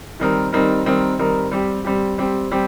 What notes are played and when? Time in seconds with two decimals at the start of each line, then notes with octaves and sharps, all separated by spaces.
0.19 D#3 G3 C4 D#4 A#4
0.52 D#3 G3 C4 D#4 A#4
0.86 D#3 G3 C4 D#4 A#4
1.19 D#3 G3 C4 D#4 A#4
1.51 G3 C4 G4
1.84 G3 C4 G4
2.18 G3 C4 G4
2.51 G3 C4 G4